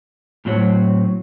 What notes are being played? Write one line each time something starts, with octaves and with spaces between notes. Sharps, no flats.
A2 F#3 C4 F#4 C#5